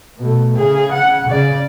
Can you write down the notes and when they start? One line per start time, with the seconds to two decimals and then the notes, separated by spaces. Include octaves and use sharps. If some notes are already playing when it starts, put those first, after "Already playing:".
0.19 B2 A3
0.57 C#3 G#4
0.92 F#5
1.30 C#3 D5